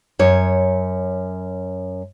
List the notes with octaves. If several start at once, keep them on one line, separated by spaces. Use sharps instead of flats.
F#2 C#5